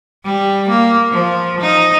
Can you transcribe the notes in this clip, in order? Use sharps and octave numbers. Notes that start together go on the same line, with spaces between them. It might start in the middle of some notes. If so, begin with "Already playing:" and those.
G3
A#3
F3
D#4